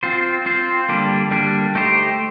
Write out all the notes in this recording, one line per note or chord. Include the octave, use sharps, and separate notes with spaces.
C4 F4 C5
C4 F4 C5
D3 G3 A#3 D4 G4
D3 G3 A#3 D4 G4
A3 D#4 G4 C5